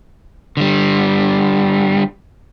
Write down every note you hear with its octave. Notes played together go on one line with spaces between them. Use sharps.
D3 G3